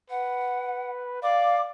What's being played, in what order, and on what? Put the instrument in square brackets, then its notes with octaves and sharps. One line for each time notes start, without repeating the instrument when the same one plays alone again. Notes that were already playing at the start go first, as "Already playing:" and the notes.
[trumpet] B4 [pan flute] F#5
[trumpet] D5 [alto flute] F5 [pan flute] D6